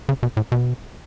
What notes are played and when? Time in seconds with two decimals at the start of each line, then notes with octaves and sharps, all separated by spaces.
0.09 C#3
0.23 B2
0.37 A2
0.52 B2